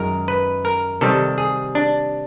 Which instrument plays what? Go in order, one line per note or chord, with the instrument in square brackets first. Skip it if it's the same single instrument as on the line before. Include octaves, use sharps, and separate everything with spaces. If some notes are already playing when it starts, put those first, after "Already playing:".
Already playing: [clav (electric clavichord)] F#2 D#3 G#3 A#4
B4
A#4
C3 D#3 G3 A4
G#4
D4